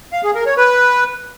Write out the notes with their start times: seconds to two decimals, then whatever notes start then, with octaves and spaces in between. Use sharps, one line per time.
0.12 F5
0.24 G#4
0.35 A#4
0.46 C#5
0.57 B4